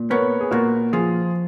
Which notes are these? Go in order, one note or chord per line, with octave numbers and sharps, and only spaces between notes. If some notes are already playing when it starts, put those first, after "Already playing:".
Already playing: A#2
B3 A#4 C#5
G#4
A#2 F#4 A#4
F3 F4 G#4